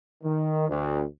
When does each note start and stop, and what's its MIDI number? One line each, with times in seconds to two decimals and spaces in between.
0.23 0.69 51
0.69 1.03 38